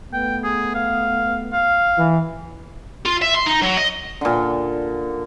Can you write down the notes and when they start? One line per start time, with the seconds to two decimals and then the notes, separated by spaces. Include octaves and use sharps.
0.13 A3 B3 G5
0.44 G#4
0.75 F5
1.53 F5
1.98 E3
3.05 F4
3.21 E5
3.34 C6
3.46 D#4
3.62 F#3
3.77 D#5
4.21 A#2 D3